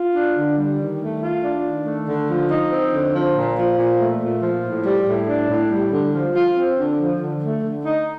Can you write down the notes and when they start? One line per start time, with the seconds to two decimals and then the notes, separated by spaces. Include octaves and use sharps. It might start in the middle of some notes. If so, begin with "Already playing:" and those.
Already playing: F4
0.15 D4
0.37 D3
0.57 G3
0.79 D#3
1.01 A3
1.22 F4
1.44 D4
1.65 D#3
1.86 A3
2.08 D3
2.29 F3
2.50 D#4
2.72 C4
2.93 D3
3.14 F3
3.36 A#2
3.57 F3
3.79 A#2
3.99 A3
4.22 A#2
4.43 F3
4.64 A2
4.85 G3
5.07 A2
5.28 D4
5.49 A2
5.71 G3
5.92 D3
6.14 F3
6.35 F4
6.56 C4
6.78 D3
6.99 F3
7.21 D3
7.42 A3
7.63 D3
7.85 D#4